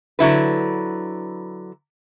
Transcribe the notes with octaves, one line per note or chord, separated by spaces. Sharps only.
D3 F#3 E4 B4